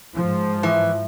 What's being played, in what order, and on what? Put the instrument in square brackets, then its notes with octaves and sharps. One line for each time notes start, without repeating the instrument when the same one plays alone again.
[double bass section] G#2 F3
[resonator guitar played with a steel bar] E3